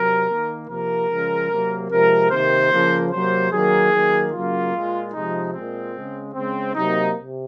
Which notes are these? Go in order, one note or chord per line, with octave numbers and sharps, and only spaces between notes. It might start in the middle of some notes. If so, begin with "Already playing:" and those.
Already playing: C3 F#3 A#4
D#3 A#3
C3 F3 A#3 A#4
C#3 F3 G#3
C3 F#3 A#3
C3 F3 G#3 A#4
C3 D#3 A#3 C5
C#3 F3 A#3
C3 F#3 A#3 C5
D#3 F#3 A#3 G#4
D#3 F#3 A#3
C#3 F#3 A#3 F4
A#2 G#3
C3 F3 G#3 D#4
A#2 G#3 C4
C#3 G#3
C#3 G#3 C4
C3 F#3 A#3 D#4
C3